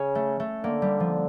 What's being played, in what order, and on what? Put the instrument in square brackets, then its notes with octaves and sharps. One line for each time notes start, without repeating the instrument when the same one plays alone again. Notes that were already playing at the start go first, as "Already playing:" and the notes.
Already playing: [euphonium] C#3 [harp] C#4
[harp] A3
A3
[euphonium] D3 [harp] A#3
[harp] G3
F3